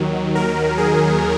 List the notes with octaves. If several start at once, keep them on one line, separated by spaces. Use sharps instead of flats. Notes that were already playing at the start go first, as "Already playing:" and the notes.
Already playing: D#2 D#3 F#3
A#4
G#4